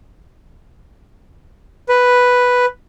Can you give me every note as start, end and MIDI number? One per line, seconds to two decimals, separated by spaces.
1.89 2.66 71